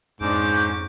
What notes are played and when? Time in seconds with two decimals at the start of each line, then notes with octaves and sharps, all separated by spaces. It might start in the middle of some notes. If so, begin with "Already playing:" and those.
0.21 F2 G#2 C#4 D4 D6 G6